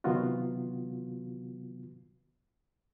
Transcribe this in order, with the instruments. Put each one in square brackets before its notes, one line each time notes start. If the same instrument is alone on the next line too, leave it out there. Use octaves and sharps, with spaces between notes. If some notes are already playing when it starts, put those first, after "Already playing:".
[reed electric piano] C3 D#3 F#3 B3 F4 F#4